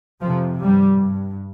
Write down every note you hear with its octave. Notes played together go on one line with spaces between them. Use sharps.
F2 C3 F3
G2 G3
G2